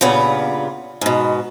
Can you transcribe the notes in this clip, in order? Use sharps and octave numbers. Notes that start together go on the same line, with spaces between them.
G2 A#2 C#3 B3
G#2 B2